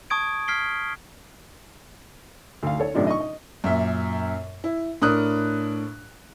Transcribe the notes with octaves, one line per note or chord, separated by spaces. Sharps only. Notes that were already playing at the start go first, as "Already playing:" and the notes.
A5 C#6 D#6 G#6 D7
F6 G#6 B6 C7 D7 G7
D2 F5
A4 C#5
F#2 A2 C3 D4 D#4 F4
D#5 C#6
D#5
F#2 A#2 E5
E4
A2 D4 A#4 D#6 F#6